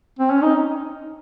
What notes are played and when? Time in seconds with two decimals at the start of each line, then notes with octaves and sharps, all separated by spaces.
0.19 C4
0.31 C#4
0.42 D#4